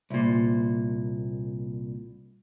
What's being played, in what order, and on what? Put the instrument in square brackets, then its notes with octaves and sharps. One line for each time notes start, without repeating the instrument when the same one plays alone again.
[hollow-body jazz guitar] C2 A#2